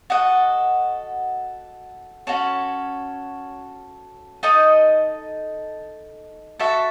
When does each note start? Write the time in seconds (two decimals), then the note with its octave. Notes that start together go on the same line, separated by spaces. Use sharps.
0.10 F#4 A4 D#5 F#5
2.27 C#4 F#4 A4 C#5
4.43 D#4 A4 D#5
6.60 F#4 A4 E5 A5